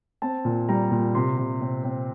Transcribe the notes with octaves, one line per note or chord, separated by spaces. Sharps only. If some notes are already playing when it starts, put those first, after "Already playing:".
C4 A5
A#2
G3 A#5
A#2
C3 C6
C3
C4
C4